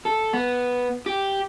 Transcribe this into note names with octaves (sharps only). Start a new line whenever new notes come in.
A4
B3
G4